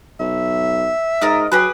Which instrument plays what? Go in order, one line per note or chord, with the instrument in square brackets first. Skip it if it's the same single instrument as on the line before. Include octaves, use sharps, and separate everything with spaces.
[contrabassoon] B1 [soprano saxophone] E5
[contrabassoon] G#2 [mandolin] F4 A#4 D#5
[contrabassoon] F#3 [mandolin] G4 G#4 B4